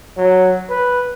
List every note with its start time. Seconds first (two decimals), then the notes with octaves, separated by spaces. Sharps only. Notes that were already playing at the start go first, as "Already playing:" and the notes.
0.17 F#3
0.69 B4